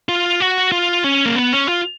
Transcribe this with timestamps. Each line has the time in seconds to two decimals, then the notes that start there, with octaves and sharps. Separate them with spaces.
0.09 F4
0.40 F#4
0.72 F4
1.04 C#4
1.26 A#3
1.36 B3
1.52 C#4
1.68 F4